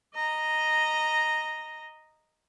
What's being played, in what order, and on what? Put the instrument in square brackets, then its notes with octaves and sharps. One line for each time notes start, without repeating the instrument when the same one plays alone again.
[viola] D#5 A#5